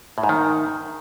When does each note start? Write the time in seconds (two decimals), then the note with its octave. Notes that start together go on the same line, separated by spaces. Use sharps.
0.18 A2
0.23 G#2
0.29 D#3